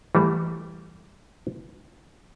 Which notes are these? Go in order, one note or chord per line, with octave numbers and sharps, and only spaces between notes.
E3 G3 A3